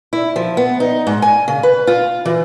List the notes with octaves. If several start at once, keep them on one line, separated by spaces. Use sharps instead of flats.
E4
F3
B3
D#4
G#2
G#5
C#3
B4
F4
E3